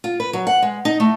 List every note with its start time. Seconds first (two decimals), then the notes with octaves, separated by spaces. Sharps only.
0.04 F4
0.20 B4
0.33 F#3
0.47 F#5
0.62 G#3
0.85 D#4
1.00 A3